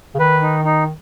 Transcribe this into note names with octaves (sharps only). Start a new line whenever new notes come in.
C#3
D#3 B4
D#4
D#4